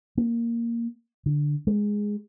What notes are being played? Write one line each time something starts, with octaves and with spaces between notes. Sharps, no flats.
A#3
D3
G#3